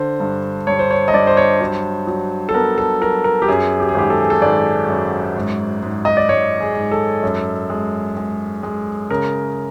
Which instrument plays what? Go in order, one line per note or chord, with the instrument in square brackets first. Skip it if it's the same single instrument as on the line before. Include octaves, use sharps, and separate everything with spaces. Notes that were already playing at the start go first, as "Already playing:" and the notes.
Already playing: [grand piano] D3 C5
G2
G2 C#5
C5
C#5
D#5
G2 D5
C5
C#5
F#3 C5
F#3
A4
B3 A#4
A4
F#3 A#4
A#4
G4
F#2 G#4
G4
G#4
G#1 G4
A4
G#4
A4
G#1 D5
F#2
G#2
G#2
D#5
D5
G#2 C#5
G#4
G#2
A4
F#2
G#3
G#3
G#3
C#3 A#4